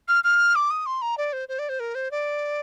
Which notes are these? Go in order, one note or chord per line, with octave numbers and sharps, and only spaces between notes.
F6
F6
D6
D#6
C6
A#5
D5
C5
C5
D5
C5
A#4
C5
D5